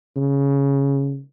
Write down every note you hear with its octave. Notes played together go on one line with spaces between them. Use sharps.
C#3